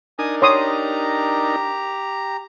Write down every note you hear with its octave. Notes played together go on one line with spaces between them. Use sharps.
D4 D#4 A#4 G#5 D#6
G4 C#5 A#5 C6 D#6